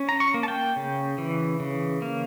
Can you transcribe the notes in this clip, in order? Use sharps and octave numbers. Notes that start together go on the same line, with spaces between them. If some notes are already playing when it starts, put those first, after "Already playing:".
Already playing: C#4
A#5
C#6
A#3
A5
G5
C#3
E3
C#3
A#3